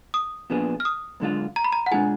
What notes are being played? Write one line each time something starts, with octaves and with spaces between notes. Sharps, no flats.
D#6
A#2 F3 B3 D4 G#4
F6
D#6
F#2 D3 G#3 D4 F4
A#5
B5
A#5
F#5
B2 G#3 D4 F4 G#4 G#5